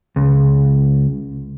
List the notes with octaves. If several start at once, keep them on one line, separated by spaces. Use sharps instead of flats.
C#2